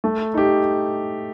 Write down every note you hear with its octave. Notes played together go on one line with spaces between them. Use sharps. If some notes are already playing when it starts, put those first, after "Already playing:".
A3
D#4 G4